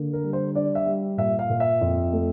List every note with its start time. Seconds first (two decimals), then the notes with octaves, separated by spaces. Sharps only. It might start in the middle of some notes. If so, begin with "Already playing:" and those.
Already playing: D3 A#3
0.13 A#4
0.23 G3
0.33 C5
0.55 D4 D5
0.75 E5
0.86 G3
1.18 A#2 E5
1.39 F5
1.49 A#2
1.60 E5
1.81 F2
2.13 A3